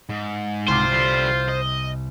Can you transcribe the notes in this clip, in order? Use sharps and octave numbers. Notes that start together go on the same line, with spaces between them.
G#2
C2 C3 F4 C5 D6
D3 G3
D#5